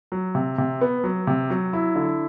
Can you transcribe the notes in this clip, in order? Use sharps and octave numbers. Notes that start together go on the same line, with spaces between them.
F#3
C3
C3
B3
F#3
C3
F#3
E4
D3